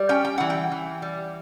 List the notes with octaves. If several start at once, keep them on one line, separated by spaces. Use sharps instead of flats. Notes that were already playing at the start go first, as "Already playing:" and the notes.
Already playing: G3
C#4 G5
G5
E3 F#5
G5
E3
G3